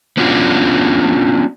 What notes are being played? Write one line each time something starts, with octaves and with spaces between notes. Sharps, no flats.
B3 C#4 D4 F4 F#4